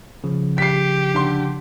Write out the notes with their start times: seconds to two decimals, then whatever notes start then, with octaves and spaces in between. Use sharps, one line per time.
0.24 C#3 F3
0.58 G4 B6 C7
1.15 D3 C6